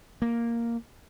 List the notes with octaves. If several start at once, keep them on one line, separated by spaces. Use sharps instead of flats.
A#3